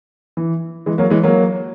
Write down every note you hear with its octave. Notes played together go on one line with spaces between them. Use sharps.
E3
E3 G#3
F#3 A#3
E3 G#3
F#3 A#3